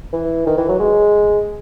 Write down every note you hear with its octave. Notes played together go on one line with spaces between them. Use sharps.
E3
D#3
E3
F#3
G#3